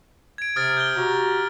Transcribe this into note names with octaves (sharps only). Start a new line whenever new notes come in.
G#6 D7
C3 D#6 F6 A6
G6 G7
F#4 G4 A#5